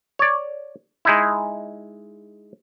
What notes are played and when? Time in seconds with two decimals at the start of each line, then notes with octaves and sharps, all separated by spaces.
0.19 C#5 D5
1.05 G#3 D#4 E4